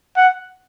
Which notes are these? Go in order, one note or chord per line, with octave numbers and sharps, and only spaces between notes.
F#5